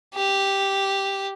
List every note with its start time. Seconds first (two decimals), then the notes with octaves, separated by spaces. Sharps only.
0.15 G4